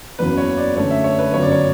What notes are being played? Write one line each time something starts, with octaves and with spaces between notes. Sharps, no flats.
F#1 E2 C#3 F#3 C#4 B4
C#5
D5
F#2 D3 A3 C#4 C#5
E5
C#5
B4
G1 F#2 C#3 F#3 C#4 C#5
D5
C#5